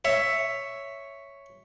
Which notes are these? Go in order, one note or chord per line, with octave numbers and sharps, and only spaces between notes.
C#5 E5